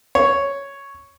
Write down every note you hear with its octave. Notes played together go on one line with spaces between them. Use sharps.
C#5